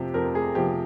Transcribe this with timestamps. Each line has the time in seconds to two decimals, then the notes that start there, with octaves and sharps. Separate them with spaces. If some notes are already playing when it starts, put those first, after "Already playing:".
Already playing: F2 C3 F3 G4
0.14 F2 A#4
0.35 G#4
0.55 C3 F3 G4